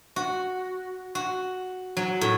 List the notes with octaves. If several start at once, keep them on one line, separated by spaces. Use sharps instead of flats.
F#4
F#4
F#3
A2